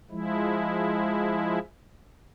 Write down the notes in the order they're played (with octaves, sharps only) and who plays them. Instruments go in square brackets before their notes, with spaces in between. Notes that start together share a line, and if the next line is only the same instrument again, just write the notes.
[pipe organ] F3 G#3 E4